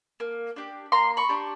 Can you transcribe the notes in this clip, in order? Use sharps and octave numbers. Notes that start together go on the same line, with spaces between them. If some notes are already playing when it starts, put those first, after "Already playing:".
A#3
D4 G4
A#3 A#5 C6
B5 C#6
D4 G4